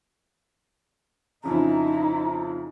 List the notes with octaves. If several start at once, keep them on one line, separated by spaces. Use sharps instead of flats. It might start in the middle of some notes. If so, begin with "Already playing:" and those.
F2 C#3 D#4 E4 A#5